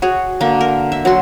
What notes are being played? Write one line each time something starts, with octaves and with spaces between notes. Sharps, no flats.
F#4 G#4 C#5
D3 A#3
A#4
E5
F#3 F#4 C6